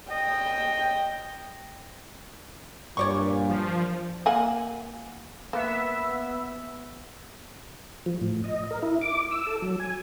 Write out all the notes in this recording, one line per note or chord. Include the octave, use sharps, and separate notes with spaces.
D#5 G5
G2 A#2 C#5 D5 C#6
F3
A#3 F#5 G#5
A#3 B3 E5
F3
A2
D#5
A#4
E4
D6
E6
A4
F#3
G#5